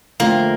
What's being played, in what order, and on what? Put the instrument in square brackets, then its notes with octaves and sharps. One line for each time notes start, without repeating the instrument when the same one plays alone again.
[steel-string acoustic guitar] F2 D3 A3 C4 F4 [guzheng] A#3